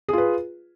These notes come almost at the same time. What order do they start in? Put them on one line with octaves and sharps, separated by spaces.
G#4 F4 B4